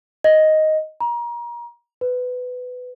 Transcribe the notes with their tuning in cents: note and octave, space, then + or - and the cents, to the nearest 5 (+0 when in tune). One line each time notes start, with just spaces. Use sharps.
D#5 +5
A#5 +30
B4 +15